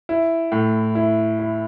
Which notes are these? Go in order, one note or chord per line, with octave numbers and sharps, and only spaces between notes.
E4
A2
E4
E4